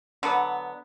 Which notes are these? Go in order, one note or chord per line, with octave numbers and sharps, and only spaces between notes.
D3 F#3 B3